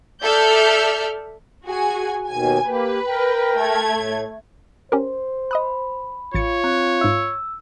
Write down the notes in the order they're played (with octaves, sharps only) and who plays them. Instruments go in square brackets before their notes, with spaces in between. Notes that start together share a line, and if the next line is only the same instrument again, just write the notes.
[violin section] A4 D5 E5 F6 G6
[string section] F#4 G#4 G#5
[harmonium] D#2 B2 D#3 [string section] G#5
[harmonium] A#3 G4 [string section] B4
[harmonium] A#4 G5
[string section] A3 G#6
[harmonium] A2
[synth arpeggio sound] C#4 G4 A#4 [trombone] C5
[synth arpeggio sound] D#5 D#6 F#6 [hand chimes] B5
[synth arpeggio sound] A1 A6 C#7 [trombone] F4 [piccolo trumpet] C#5
[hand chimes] C4 A#5 F#6
[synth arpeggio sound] G#2 E5 [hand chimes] E6